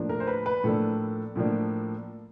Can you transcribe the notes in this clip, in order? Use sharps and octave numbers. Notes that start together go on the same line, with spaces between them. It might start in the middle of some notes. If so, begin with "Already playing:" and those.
Already playing: A2 F3 A#3 D4
A#4
C5
B4
B4
A2 F3 A#3 D4 A4
A2 F3 A#3 D4